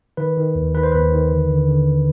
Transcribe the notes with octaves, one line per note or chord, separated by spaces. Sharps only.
D#3 B4
D#3
D#2
D#3 B4
C5
D#2 B4
D#3
D3
D3
D3